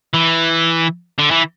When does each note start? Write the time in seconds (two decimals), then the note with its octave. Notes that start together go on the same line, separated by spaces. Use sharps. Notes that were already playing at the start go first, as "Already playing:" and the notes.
0.14 E3
1.19 D3
1.31 E3